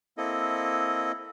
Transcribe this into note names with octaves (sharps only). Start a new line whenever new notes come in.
A#3 C4 E4 A4 D#5